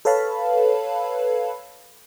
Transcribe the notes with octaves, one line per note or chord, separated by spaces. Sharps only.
A4 B4 C#5 F5 A5 B5